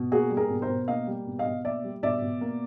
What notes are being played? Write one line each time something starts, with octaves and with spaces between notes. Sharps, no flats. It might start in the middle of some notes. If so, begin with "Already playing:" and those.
Already playing: B2
A#3 F#4 G#4
G3
G#4 A#4
B2
A#4 C5
B2
A#3 D#5 F5
G3
B2
D#5 F5
B2
A#3 D5 E5
G3
B2 D5 E5
B2
A#3